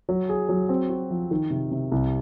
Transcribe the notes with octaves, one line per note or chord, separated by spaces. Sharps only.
F#3
G#4
F#3
C4
F#4
F3
D#3
C3
C3
C2